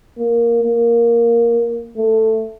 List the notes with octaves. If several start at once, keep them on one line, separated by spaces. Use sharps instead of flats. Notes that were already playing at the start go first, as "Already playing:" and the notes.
A#3
A#3
A3